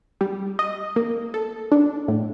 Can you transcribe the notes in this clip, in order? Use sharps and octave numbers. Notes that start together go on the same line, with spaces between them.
G3
D#5
A#3
A4
D4
A2